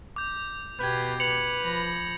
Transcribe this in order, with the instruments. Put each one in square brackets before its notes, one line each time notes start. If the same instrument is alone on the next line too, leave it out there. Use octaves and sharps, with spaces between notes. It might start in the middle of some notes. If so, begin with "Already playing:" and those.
[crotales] D6 G6
[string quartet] B2 G4 [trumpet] B4 [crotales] G6 G#6
[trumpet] B4 [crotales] C#7 F7 F#7
[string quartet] F3 B5 A#6